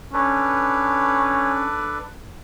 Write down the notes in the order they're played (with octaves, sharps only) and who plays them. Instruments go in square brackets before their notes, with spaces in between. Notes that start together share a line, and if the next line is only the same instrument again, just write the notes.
[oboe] C#4 [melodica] D4 A4 B4